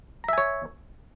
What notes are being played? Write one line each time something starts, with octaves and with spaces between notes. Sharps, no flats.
C#5 E5 G#5 A#5